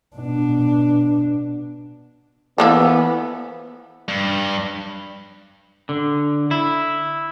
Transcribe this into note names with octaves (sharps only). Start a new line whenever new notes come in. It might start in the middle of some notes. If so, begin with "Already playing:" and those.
B2 D4
E3 F3 A#3 B3 A4
G2
D3
E4